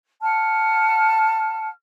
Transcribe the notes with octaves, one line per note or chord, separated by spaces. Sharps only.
F#5 A5 F6